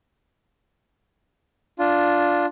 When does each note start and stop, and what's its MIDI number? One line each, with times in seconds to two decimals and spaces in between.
1.79 2.46 62
1.79 2.46 65